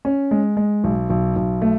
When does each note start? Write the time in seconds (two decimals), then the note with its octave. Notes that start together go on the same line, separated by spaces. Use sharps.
0.05 C#4
0.31 G#3
0.57 G#3
0.84 B1
1.10 B1
1.36 B1
1.62 A3